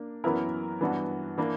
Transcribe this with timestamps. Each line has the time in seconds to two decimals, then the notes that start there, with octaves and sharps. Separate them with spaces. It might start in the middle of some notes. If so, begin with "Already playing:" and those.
Already playing: A#3 D4
0.24 F#2 E3 B3 E4 A#4
0.81 G2 E3 B3 D4 F#4
1.38 E3 A#3 D4